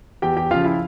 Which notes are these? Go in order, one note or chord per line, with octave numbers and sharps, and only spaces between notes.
E2 G4 G5
G4 G5
C#3 F3 F4 F5
E4 E5